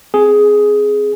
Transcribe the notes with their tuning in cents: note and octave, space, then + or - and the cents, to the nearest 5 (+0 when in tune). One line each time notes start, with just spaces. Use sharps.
C4 +0 G#4 +10